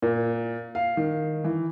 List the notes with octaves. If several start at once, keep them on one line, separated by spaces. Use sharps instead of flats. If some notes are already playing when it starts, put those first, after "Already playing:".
A#2
F5
D#3
E3